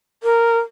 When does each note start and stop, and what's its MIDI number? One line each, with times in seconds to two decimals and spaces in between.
0.23 0.57 70